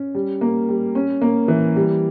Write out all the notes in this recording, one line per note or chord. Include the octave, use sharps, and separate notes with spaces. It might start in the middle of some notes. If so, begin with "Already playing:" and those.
Already playing: C#4
G3
A#3
G3
C#4
A#3
E3
G3